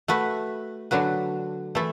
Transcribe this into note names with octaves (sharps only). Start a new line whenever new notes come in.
A3 F#4 B4
D3 F#3 D4 F#4 B4
E3 A3 E4 A4